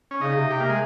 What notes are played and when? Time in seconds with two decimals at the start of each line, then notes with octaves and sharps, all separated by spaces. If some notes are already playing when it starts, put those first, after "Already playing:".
0.11 C#4
0.21 C#3 D#4
0.36 C3
0.50 C3 G4
0.60 A#3
0.69 G#3